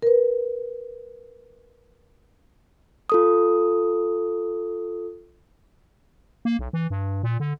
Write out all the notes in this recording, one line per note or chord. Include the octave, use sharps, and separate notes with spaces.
A#4 B4
F4 A4 D#6
A#3
B1
E3
G2
A#2
D3